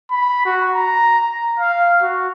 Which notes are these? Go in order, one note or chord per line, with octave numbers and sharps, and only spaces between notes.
B5
F#4
A#5
A#5
F5
F#4